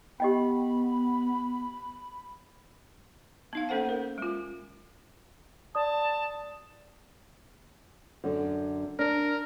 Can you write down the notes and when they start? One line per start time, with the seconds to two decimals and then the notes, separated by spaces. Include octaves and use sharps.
0.20 B3 G4 D#5 G5 B5
3.53 B3 D#4 F5
3.69 A#3 C#4 A4 C5 F#5
3.89 A#4
4.18 G#3 F4
5.75 D5 A5 D#6
8.24 F#2 D3
8.99 D4 A#4